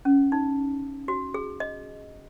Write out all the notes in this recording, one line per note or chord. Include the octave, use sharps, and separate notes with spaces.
C#4
D#4
F#4
G#4
D#5